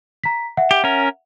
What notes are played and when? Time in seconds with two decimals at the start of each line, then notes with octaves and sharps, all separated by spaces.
0.24 A#5 B6
0.57 E5 F#5
0.71 G4
0.84 C#4 A#4